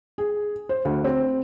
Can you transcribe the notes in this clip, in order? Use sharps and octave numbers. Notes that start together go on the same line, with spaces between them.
G#4
C5
D2
C4